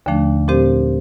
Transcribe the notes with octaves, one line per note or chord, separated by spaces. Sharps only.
D#2 D3 F3 A3 D4
A#2 F3 C4 G4 C5